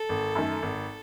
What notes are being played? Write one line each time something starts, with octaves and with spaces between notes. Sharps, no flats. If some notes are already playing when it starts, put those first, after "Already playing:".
Already playing: A4
G#1
F#2 D#3 A3
G#1